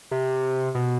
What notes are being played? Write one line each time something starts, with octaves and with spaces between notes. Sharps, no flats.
C3
B2